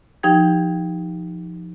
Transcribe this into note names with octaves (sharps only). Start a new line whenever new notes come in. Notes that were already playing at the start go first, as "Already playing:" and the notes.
F3 D#4 G4 G5 G#6